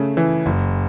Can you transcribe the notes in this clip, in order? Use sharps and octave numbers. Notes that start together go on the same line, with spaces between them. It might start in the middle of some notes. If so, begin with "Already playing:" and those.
Already playing: C#3 A3
E3
F#1